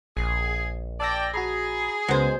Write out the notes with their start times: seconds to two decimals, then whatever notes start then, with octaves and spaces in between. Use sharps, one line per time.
0.17 A#1 G#4
1.00 D5 G5 A5 E6 A#6
1.34 F#4 G#4 A#5 B5
2.08 C#2 C#3 F#3 G#3 B3 C5